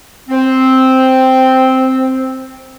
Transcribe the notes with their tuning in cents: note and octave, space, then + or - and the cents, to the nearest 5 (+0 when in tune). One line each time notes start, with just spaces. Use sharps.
C4 +0